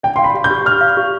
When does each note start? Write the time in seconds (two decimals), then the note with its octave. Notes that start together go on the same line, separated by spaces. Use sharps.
0.03 D5 G5
0.16 F5 C6
0.24 B5
0.34 G4
0.44 G6
0.50 G4
0.66 D5 F6
0.81 F5
0.97 G4